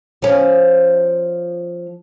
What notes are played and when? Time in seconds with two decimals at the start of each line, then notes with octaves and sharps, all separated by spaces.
0.22 F3 C#4